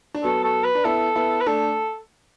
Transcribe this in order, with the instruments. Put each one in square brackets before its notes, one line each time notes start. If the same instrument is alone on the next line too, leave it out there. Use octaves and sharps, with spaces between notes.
[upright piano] D4
[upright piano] F#3 B3 [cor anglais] A4
[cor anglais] A4
B4
[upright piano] D4
[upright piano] B3 E4 [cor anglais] A4
[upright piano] B3 E4
[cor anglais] B4
[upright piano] A3 D4 [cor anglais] A4